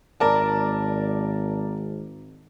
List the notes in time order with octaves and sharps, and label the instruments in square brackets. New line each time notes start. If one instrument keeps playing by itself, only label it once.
[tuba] G#1 [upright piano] A#4 D5 A5